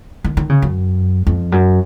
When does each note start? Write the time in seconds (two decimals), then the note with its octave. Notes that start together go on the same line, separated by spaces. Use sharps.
0.25 D#3
0.37 D#3
0.49 C#3
0.62 F#2
1.27 F2
1.52 F#2